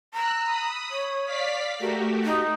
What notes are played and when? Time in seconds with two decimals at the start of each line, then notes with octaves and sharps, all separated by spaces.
0.14 A#5 E6 F#6
0.43 B5 D#6
0.90 C#5
1.25 D5 F5 B6
1.79 A3 F#4 G4 A#4
2.24 D#4